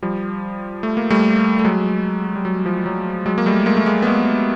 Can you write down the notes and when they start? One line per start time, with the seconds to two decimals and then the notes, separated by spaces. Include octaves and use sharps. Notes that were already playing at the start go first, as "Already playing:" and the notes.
0.02 F3 G3
0.83 A3
0.97 A#3
1.10 G3 A3
1.59 A3
1.65 F#3 G#3
2.35 G3
2.45 F#3
2.66 F3
2.86 F#3
3.26 F#3 G#3
3.38 A#3
3.46 G3 A3
3.66 G#3 A#3
3.77 A3
3.86 G#3 A#3
4.02 B3
4.07 G#3 A#3